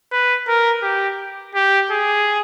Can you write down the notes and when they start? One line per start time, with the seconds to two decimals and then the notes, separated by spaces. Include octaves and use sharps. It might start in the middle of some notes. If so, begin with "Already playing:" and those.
0.12 B4
0.48 A#4
0.83 G4
1.55 G4
1.91 G#4